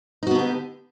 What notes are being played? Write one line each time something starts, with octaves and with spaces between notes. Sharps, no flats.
D3 B3 D#4 F#4 G4